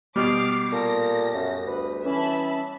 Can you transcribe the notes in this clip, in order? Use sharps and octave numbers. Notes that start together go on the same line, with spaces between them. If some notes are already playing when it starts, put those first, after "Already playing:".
B2 G3 D6 F6 C7
A#2 A4 A#6
F#2
D2 B4
E3 C#4 E5 A5 B5